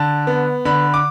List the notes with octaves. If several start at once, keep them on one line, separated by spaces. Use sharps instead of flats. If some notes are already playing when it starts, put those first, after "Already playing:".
Already playing: D3 A5
B3
D3 B5
D6